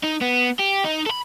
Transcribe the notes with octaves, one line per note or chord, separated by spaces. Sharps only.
D#4
B3
G4
D#4
A4 B5